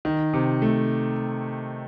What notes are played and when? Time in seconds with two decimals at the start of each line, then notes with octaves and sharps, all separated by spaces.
0.05 D#3
0.33 C3
0.62 A3